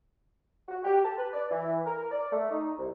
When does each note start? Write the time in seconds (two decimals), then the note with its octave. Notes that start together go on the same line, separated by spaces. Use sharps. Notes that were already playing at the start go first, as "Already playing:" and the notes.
0.69 F#4
0.84 G4
1.05 A5
1.17 B4
1.34 D5
1.51 E3
1.86 A#4
2.12 D5
2.32 A3
2.50 D#4
2.78 C2